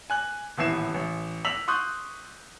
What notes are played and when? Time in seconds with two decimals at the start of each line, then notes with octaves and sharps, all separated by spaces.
0.10 G#5 F#6 F#7
0.57 D#1 A1 B3 E4 C7 E7
0.94 A1
1.45 E6 B6 F7 F#7
1.68 C6 C#6 D#6 F#6 G6